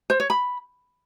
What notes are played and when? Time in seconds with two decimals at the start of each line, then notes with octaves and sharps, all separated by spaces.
0.10 C5
0.20 C#5
0.30 B5